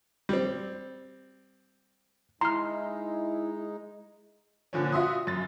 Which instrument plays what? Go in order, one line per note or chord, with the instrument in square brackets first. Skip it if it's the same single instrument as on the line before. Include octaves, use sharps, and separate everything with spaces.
[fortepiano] G3 C4
[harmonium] G#3 D#4 [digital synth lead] E4 [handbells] A#5 F6 [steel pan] C6
[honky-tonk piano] A#2 D3 F3 C#4
F4 F#4 E5 C6 D#6
F#2 A6